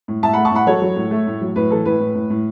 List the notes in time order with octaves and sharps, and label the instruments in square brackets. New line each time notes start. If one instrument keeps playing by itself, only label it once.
[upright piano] A2
A2 E5 A5
A3 F#5 B5
A5 C#6
A2 F#5 B5
F#3 A4 C#5
F#3
A2
A3
A2
F#3
A2 B4
E3 A4
A2 B4
A2
A2
A2